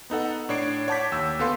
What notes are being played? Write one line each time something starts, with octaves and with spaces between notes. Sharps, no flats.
B3 D#4 A4 F#5
A2 D4 C#5 C7 D7
C#5 F#5 A5 D6 G6 B6
D#2 E6
D2 B3 A4 F5 C6